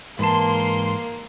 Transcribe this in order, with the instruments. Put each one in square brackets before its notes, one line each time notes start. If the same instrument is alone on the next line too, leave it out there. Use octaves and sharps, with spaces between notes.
[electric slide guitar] G#2 A5 [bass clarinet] E3 [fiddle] A#3 [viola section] C6